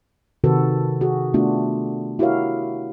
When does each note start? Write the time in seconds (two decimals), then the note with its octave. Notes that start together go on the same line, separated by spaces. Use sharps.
0.44 C3 D#3 F#4 A4 B4
1.01 F#4 G#4
1.34 A3 B3 D4 F4 F#4
2.19 E4 F#4 G4 A#4 C#5 F5